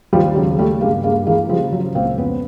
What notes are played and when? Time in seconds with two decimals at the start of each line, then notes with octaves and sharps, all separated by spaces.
0.13 D#2 F3 G3
0.36 C#3 F#3 G#3
0.58 C#3 G3 A3
0.81 G2 G#3 A#3
1.04 G2 G#3 A#3
1.27 E3 G#3 A#3
1.49 C#3 F3 G3
1.72 F3 F#3
1.95 C#2 A#3 C4
2.18 F2 B3 C#4